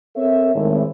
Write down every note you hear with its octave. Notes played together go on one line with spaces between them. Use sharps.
C4 A4 A#4 C#5 E5
G#1 A2